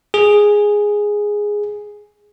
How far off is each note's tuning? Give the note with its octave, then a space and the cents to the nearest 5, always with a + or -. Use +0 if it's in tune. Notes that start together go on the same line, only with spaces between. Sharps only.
G#4 -5